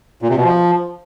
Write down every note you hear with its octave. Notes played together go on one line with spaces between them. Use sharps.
A#2
C3
B2
F3